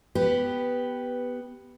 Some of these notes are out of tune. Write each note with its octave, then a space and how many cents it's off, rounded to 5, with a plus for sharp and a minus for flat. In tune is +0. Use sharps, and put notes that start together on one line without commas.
B3 +0 G4 +0 B4 +5